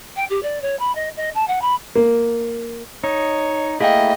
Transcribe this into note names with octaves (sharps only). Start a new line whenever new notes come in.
G5
G4
D5
C#5
B5
D#5
D#5
A5
F#5
B5
A#3
D#4 C#5
A3 A#3 E4 G#4 D#5 F5 G5